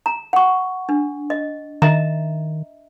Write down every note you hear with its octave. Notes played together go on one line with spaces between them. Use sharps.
A#5
F#5 C#6
D4
D#5
D#3 D#5 E5 A#5